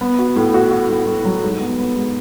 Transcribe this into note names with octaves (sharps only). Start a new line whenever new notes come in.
B3
F#4
A2
F#4
F#4
A2
A2
F#3
G#2
B3
B3
G#2